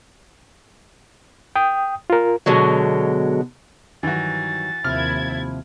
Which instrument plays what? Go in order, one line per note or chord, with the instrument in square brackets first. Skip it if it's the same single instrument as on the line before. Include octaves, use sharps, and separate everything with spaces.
[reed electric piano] G5 D#6
F4 A#4
[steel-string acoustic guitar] B2 D3 F#3 G#3
[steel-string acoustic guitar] G2 D#3 F#3 [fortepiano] E3 F#4 [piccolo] A6
[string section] D#2 E4 G#6 [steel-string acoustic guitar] C3 F3 [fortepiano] F6